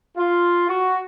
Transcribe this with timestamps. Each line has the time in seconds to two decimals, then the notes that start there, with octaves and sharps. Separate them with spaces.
0.16 F4
0.68 F#4